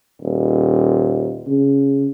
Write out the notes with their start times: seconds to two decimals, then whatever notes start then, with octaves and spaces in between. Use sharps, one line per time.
0.22 D#1
1.47 C#3